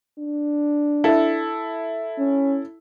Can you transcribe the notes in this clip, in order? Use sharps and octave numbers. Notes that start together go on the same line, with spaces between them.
D4
E4 A4
C#4